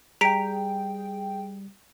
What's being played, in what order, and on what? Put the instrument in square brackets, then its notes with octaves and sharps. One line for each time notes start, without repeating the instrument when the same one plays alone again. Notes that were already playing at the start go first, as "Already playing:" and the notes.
[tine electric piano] G3 [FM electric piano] G#4 G5 [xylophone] A#5 B6 D7